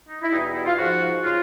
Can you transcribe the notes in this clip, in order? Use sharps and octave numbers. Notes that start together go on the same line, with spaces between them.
D#4
E4
E2 B2 G3 D#4
D#4
E4
F4
G#2 F3 F#4
C#3 F3 F4